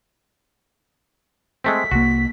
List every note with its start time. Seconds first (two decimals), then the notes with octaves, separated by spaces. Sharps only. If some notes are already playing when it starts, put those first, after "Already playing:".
1.64 G#3 A3 C4 B6
1.91 C2 A#3 F#4